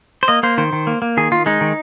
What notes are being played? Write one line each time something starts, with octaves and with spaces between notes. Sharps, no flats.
C5
A#3 D#5
A#3 C5
D#3 C5
D#3
A#3
A#3
D#3 G#4
D#3 F4
G#3 D#4
D#3